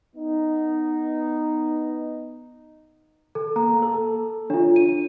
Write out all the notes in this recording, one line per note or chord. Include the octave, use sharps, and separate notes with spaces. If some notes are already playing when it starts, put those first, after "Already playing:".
B3 D#4
A4
A#3 A#5
A4
D4 F4 C#5
D#7